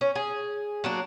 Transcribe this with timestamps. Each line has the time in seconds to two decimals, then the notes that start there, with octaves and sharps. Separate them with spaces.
0.01 C#4
0.15 G#4
0.84 F#3 A#3 D4